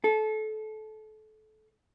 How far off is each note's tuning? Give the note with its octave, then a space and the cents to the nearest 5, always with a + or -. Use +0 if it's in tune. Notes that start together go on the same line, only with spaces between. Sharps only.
A4 -25